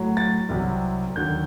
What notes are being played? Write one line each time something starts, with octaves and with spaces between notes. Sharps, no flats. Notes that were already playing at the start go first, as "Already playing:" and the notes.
Already playing: A2 F#3
A6
C2 C3 F#3
D#2 D3 F#3 G6